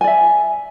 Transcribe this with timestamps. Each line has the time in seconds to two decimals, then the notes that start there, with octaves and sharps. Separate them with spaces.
0.01 G#5
0.04 D5
0.07 E5